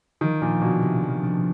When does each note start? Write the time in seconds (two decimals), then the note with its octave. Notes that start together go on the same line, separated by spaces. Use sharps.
0.21 D#3 F3
0.42 A#2 D4
0.62 B2 A#3
0.82 C3
1.03 F3
1.23 D4